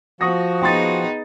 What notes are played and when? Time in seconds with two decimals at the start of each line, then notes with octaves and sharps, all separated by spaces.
0.21 F3 F#4 C#6 D#6 A#6
0.62 B3 D#4 G#4 G5 C6 A6